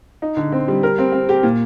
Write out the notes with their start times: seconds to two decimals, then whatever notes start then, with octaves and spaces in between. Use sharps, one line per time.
0.22 D#4
0.37 D3
0.52 C4
0.68 G3
0.83 A#4
0.98 C4
1.12 C4
1.29 G4
1.43 A#2